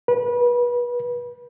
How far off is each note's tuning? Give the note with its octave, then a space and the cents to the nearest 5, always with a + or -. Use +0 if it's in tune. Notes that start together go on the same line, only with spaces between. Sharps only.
B4 -30